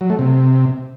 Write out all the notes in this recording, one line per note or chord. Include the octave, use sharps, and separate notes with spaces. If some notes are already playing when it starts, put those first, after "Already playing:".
F#3
A3
C3